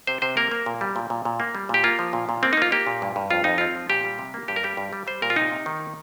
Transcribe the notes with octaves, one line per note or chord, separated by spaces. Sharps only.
C3 C5
C3 C5
A#3 A#4
A#3
A#2
G3
A#2
A#2
A#2
A#3
G3
A#2 G4
A#3 F4
F3
A#2
A#2
A#3 C4
D#4
A#3 F4
A#3 G4
A#2
G2
G2
F2 F4
F2 D#4
C4 F4
F3
A#2 G4
G3
C3
A#3
G2 G4
A#4
G3 G4
G2
G3
G3 C5
A#2 A#4
F4
C3 D#4
C3
D#3
A#3